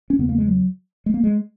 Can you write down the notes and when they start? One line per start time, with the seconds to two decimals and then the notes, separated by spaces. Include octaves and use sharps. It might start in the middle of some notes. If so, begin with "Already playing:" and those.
0.10 C#4
0.19 E2 C#3 B3
0.29 A#3
0.38 G#3
0.47 F#3
1.06 G#3
1.14 A#3
1.24 G#3